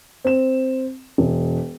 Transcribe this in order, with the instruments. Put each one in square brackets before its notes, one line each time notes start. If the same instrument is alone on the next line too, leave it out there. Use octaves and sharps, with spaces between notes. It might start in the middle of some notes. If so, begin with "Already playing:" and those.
[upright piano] C4 E7
E1